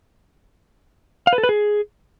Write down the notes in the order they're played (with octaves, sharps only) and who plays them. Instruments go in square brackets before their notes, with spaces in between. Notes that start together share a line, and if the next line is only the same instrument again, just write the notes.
[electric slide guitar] F5
B4
A4
B4
G#4